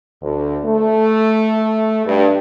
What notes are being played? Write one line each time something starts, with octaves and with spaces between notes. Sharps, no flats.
D2
A3
G2